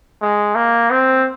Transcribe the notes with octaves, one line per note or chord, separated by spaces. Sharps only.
G#3
A#3
C4